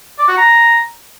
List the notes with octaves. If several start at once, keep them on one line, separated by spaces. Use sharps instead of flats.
D5
F#4
A#5